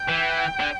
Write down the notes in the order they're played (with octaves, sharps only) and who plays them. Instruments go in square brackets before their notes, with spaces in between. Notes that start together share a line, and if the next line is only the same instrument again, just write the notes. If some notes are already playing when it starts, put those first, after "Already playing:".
Already playing: [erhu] G5
[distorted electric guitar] E3
D3